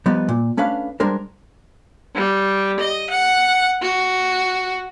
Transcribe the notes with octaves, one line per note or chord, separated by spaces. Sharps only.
F3 G3 B3 D#4
A#2
A3 C#4 D4 B4 F5
G3 G#3 D4 A#4 C5
G3
D#5
F#5
F#4